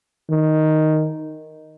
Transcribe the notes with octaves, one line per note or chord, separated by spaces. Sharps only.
D#3